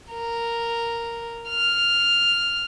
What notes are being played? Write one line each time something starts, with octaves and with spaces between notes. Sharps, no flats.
A#4
F6